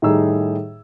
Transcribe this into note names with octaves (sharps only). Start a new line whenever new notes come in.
A2 D#3 G3 D#4 G#4 E6